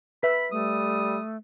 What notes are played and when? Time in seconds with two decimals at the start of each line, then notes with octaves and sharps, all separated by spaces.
0.23 B4 E5 B5
0.52 G3 A3 D#6